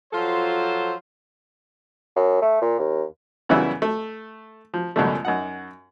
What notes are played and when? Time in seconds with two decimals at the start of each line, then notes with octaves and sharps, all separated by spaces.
0.13 F3 F#3 F4 A4 C5
2.16 F#2
2.42 A3
2.62 A#2
2.79 D#2
3.49 F#2 C#3 E3 G3 B3 E4
3.82 A3
4.74 F3
4.96 C#2 F#2 B2 F3 G3 A3
5.25 F#2 D#4 F#5